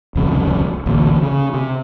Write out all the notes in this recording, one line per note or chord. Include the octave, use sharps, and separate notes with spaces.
D1 C2 F2 C#3
A1 D2 A#2
C#3
C3